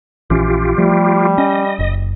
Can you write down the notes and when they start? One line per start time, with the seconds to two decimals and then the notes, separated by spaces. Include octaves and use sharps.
0.30 A#1 E3 C#4 F4 G4
0.78 F3 G3 A3
1.38 C#4 D#5
1.79 F#1